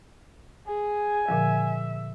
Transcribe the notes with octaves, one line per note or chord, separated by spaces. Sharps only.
G#4 G#5
A#2 D3 F3 E5